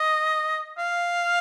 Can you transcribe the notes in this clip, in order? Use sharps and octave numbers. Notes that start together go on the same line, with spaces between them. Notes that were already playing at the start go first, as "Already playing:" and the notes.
Already playing: D#5
F5